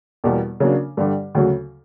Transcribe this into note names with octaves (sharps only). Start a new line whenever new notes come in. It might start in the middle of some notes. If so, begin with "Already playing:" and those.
E2 B2 G3 A#3
C#3 F#3 A#3 D4
G2 D3 G3
D2 C#3 F#3